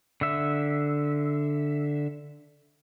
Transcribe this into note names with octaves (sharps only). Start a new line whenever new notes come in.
D3 E5